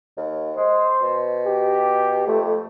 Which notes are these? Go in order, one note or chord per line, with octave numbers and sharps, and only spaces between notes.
D#2
G#3 C5
B2
G4
F2 A3